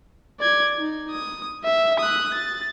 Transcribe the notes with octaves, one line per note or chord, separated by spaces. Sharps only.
D5 G#6
D#4
D#6
E5
D#6 F#6
A6